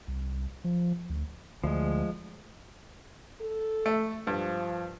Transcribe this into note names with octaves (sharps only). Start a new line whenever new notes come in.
C2
F3
D2
D2 F3 G#3
A4
A3
G2 F3